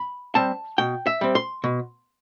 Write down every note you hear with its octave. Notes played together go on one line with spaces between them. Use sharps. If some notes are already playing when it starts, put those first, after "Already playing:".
Already playing: B5
G3 C4 A5
B2 G5
E5
G3 C4
C6
B2